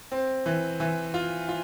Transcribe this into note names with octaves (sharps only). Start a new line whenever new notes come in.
C4
E3
E3
F4
F4